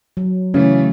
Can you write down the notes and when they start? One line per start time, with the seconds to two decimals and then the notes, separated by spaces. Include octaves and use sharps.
0.17 F#3
0.54 C#3 E3 A3 C#4